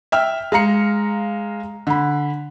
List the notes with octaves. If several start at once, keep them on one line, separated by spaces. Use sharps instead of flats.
E5 G5 F6
G#3 F5 A#5 C#7
D3 B5